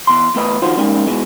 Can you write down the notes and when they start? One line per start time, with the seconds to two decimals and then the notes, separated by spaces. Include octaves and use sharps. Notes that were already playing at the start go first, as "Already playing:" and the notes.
0.07 E2 C6
0.35 E2 A3 B4 D#5
0.62 D3 D#3 F3 F4 F#4 C5
0.77 G3 G#3 A#3 C#4 D#4
1.07 G#2 B2 E3 G#3